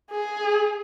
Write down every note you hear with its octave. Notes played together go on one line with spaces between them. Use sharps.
G#4